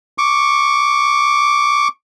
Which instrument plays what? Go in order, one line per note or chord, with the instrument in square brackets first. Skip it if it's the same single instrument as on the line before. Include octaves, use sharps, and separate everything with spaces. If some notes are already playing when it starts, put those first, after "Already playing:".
[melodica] C#6 D6